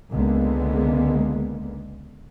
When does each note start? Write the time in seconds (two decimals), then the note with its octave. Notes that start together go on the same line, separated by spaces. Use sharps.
0.11 C#2 D3 G#3 A#3 B3